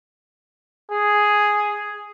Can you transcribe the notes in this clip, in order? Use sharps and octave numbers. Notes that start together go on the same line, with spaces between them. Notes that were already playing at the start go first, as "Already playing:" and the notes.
G#4